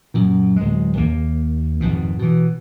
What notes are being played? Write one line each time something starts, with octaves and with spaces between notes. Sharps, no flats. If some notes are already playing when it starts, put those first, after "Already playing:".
F#2 A#2
D1 G#3
D#2 A#3
G#1 F2 G#2 B2
B2 E3